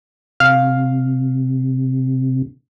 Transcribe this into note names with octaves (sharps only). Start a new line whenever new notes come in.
C3 F5